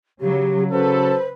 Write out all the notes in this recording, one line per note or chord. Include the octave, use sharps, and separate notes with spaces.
C#3 F#3 G4
C#3 F#3 A4 B4 C5